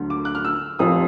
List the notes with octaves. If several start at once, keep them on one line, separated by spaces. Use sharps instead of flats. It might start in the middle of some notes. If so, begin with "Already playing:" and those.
Already playing: D2 D3 F#3
D6
F#6
F6
E6
F1 F2 C3 F3 D#6